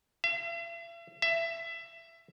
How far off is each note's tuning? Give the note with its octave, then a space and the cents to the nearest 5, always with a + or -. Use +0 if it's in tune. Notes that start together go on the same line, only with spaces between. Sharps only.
E5 +45
E5 +20